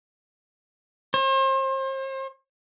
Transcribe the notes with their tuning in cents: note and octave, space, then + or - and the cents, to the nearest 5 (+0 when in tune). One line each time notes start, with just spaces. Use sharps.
C5 +40